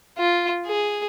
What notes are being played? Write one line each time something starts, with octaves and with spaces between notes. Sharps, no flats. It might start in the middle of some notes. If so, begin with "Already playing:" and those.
F4
G#4